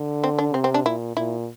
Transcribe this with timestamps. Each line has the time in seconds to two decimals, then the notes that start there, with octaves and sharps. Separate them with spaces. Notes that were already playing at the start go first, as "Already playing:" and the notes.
Already playing: D3
0.24 C4
0.39 D4
0.54 C3 C4
0.64 C4
0.74 D4
0.85 A#2 E4
1.17 A#2 E4